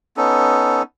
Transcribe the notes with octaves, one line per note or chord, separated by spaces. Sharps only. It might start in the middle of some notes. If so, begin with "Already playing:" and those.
B3 C#4 D#4 A4